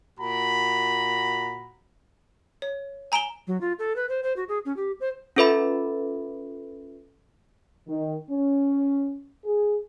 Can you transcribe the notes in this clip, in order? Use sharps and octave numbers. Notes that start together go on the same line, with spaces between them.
A#2 F#4 A#5 B5
C#5
G#5 A#5 D7 E7 G7
F#3
F4
A4
B4
C5
C5
F#4
G#4
C#4
G4
C5
C#4 F4 A4 B4 E5 B5
D#3
C#4
G#4